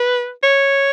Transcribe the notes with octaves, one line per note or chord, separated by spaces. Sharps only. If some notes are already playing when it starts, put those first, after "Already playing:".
Already playing: B4
C#5